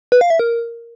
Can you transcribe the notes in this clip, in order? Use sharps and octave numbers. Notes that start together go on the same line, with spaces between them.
B4
F5
E5
A#4